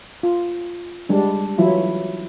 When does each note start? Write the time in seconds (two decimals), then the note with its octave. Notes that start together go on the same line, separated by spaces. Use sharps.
0.23 F4
1.09 G3 G#3 D4
1.58 E3 F#3 E4 F4